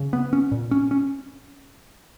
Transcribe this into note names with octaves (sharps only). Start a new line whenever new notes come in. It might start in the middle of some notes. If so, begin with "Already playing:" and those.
Already playing: C#3
B3
C#4
A#2
C#4
C#4